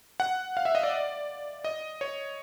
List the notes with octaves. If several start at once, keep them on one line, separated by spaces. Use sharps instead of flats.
F#5
F5
E5
D#5
D5
D#5
C#5